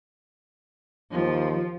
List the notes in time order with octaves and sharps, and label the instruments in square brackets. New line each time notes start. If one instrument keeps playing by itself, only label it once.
[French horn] D#2 [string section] F3